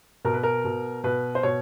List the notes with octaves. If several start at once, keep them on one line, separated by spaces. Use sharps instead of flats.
B2 A#4
B4
A#4
B2
B2 B4
C5
B2 C#5